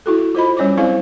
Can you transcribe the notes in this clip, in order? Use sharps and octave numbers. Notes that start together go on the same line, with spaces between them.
E4 F#4 A4
F4 C5 D#5 B5
G3 C#4 C#5 D#5 D6
F#3 C4 E4 G#4 C5 F5